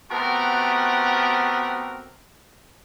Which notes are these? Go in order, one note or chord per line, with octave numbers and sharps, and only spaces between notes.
A3 B3 C4 F#4 G4 A#4